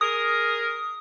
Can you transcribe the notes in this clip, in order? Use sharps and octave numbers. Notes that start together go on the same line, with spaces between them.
G#4 A#4 D#6